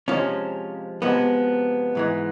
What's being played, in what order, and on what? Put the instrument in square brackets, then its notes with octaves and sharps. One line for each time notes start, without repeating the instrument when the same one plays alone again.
[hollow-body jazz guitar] C3 F3 G#3 C#4
C3 F3 G#3 B3
G#2 E3 G#3